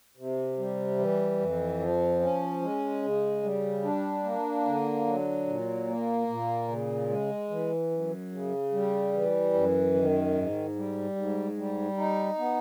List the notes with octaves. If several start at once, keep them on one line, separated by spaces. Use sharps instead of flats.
C3
G3
E3
F2
F3
C#4
G#3
C#3
G3
D4
A#3
D3
F#3
A#2
A#3
A#2
C#3
G#3
E3
F#2
C#3
G3
E3
F#2
D#3
G#2
G3
G#2
G3
D#4
B3